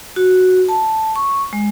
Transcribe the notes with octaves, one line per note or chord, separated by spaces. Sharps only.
F#4
A5
C#6
G#3